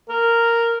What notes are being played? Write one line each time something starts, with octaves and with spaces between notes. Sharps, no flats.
A#4